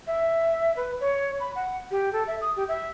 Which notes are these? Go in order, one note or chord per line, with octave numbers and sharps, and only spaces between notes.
E5
B4
C#5
B5
F#5
G4
A4
E5
D#6
G4
E5